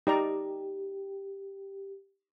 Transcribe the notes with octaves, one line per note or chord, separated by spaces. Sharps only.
D#4 G4 D5 A#5